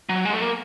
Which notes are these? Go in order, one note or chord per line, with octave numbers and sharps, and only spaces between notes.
F#3
G#3
A3
A#3